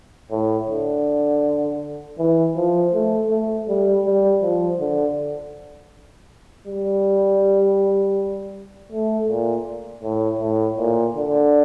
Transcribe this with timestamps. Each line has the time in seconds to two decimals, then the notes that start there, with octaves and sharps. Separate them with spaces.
0.31 A2
0.68 D3
2.19 E3
2.56 F3
2.94 A3
3.31 A3
3.68 G3
4.06 G3
4.42 F3
4.80 D3
6.67 G3
8.92 A3
9.28 A#2
10.03 A2
10.41 A2
10.78 A#2
11.15 D3